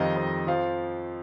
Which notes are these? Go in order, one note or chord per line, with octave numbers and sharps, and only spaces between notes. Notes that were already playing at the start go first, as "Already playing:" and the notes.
Already playing: F2 D#3 G3 D#5 F5
F2
F3 F5